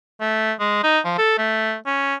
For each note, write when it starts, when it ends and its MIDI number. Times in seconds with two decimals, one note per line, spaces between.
0.21 0.52 57
0.60 0.81 56
0.84 0.99 63
1.05 1.18 53
1.18 1.38 69
1.38 1.76 57
1.86 2.15 61